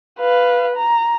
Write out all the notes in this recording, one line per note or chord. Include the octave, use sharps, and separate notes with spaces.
B4 F5
A#5